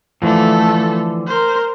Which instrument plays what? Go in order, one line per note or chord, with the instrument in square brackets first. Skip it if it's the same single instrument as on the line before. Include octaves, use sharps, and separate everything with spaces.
[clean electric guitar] D3 E3 F3 [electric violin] A3 A4
[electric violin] A#4 C5